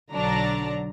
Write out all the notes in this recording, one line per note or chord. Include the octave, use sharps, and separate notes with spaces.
B1 D3 F#3 D4 A#5